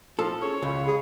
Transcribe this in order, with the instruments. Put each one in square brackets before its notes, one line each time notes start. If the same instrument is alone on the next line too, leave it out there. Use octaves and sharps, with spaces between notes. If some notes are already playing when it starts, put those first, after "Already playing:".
[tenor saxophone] F3 [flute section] E4 [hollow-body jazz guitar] A4
[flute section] C#4 G#4 [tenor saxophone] C#5
[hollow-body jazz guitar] C#2 [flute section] F5 B5
[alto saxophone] G#4